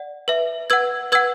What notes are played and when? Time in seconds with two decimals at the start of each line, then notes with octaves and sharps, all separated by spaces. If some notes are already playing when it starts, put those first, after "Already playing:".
Already playing: D5 F#5
0.28 B4 E5
0.70 B4 F#5 E6 G#6
1.12 B4 F#5 E6 G#6